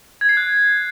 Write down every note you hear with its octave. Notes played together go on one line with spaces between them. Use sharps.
G#6
C7
F#6